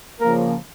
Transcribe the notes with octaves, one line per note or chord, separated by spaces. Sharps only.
C#3 F3 A#3 A#4